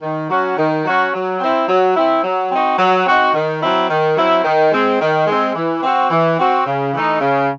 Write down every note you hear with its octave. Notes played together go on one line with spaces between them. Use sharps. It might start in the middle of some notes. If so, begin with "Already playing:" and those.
D#3
F#3 C#4 F#4
D#3
F#3 C#4 F#4
F#3
C4 E4
F#3
C4 E4
F#3
C4 D#4 F#4
F#3
C4 D#4 F#4
D#3
F#3 C4 E4
D#3
F#3 C4 E4
D#3
G#3 C4
D#3
G#3 C4
E3
C4 F#4
E3
C4 F#4
C#3
E3 A3 D#4
C#3